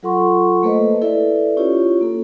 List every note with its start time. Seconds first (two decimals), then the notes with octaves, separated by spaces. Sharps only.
0.03 F#3 F4 A4 F#5 C6 C#6
0.63 A3 A#3 A4 B4 C5 D#5
1.02 E4 A4 B4 D5 E5
1.57 C#4 E4 F4 G4 C#5
2.01 A#3 A4